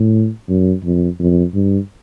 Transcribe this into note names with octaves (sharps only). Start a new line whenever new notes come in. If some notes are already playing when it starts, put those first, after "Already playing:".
Already playing: A2
F#2
F2
F2
G2